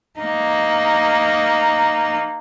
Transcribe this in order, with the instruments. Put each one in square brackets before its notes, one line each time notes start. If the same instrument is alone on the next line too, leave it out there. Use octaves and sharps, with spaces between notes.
[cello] A#3 D#4